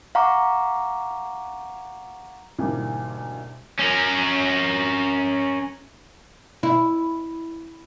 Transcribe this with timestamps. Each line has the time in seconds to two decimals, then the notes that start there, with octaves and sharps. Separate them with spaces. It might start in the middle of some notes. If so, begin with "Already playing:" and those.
0.15 F5 F#5 A#5 C#6 D6
2.59 D2 G#2 B2 E3 G3 A#3
3.79 C#4 A#4
6.63 E4